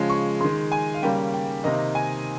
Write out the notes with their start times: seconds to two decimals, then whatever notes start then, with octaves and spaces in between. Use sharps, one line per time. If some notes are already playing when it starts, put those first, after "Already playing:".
Already playing: C#3 F3 G#3
0.10 C#6
0.41 D#3 G#3 C6
0.72 G#5
0.94 F5
1.02 C#3 G3 A#3 G5
1.34 G5
1.64 C3 D#3 A#3 D#5
1.95 G#5